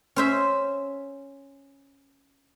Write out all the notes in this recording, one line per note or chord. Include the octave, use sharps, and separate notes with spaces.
C#4 C5 E5